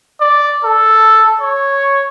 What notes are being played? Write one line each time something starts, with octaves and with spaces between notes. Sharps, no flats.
D5
A4
C#5